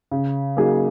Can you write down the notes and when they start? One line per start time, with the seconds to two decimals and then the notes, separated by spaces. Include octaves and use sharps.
0.11 C#3
0.57 F#3 A#3 D#4 G#4